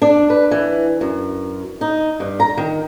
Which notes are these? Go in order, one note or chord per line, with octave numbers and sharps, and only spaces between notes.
D4
B4
E3
F#2
D#4
G2
A#5
D#3